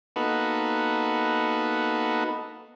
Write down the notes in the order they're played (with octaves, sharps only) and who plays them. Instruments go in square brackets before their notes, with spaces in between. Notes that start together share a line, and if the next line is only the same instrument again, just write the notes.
[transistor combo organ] A#3 B3 D#4 F#4 A4 B4